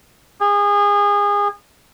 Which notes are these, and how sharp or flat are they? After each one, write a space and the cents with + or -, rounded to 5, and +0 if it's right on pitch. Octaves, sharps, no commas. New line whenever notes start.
G#4 -30